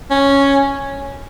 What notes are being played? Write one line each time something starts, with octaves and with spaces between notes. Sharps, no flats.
C#4